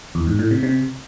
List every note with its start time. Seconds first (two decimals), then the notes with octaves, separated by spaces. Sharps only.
0.15 E2
0.27 G#2
0.39 A2
0.51 C3
0.63 C3